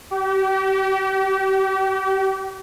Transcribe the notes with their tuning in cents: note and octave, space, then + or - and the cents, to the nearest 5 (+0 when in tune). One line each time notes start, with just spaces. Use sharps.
G4 -35